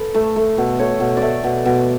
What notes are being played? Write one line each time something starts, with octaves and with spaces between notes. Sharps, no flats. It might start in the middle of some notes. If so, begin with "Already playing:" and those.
Already playing: A4 B4
A3
A3
B2
A3 C#5
B2
A3 D5 E5
B2
B2